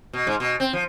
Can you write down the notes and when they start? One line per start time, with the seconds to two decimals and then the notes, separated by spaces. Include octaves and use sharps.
0.13 B2
0.27 G#2
0.40 B2
0.60 C4
0.73 F3